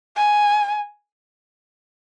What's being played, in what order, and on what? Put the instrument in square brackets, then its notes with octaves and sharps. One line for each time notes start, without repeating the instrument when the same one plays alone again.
[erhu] G#5